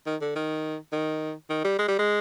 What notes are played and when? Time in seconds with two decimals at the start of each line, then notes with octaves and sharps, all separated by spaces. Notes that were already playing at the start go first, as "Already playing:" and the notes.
0.06 D#3
0.21 D3
0.36 D#3
0.92 D#3
1.50 D#3
1.64 G3
1.79 G#3
1.89 G3
1.99 G#3